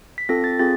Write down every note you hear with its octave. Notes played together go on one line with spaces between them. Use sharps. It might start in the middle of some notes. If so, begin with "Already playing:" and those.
B6
C4 F4 A4 A#6
A6
C4 F4 G#4 A6